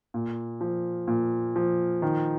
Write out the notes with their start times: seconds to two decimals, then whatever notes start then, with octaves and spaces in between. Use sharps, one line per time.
0.14 A#2
0.61 F3
1.08 A#2
1.56 F3
2.02 D#3